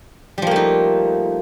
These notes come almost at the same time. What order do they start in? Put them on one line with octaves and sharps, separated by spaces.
G3 F3 A#3 A3 D#4